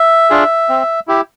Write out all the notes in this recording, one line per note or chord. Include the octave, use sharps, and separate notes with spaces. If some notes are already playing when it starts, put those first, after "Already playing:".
Already playing: E5
D4 F4 G#4
C4
E4 G4